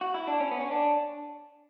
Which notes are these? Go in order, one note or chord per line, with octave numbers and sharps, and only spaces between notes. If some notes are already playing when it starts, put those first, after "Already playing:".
F#4
E4
D4
C#4
B3
C#4
D4